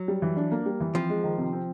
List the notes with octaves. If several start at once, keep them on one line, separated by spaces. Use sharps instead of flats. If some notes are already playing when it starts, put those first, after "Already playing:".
Already playing: F#3
G3
E3
D4
A#3
G3
E3
F3 C4
G#3
D#3
C3
C4